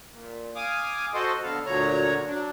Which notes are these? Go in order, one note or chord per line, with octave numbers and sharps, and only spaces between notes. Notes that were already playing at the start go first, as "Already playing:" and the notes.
A#2
F5 G#5 D6 D#6
F#4 A4 C5 D#5
D3 B3 A4 F5
D2 A#2 D3 F#3 C#5 A#5
F#3 D4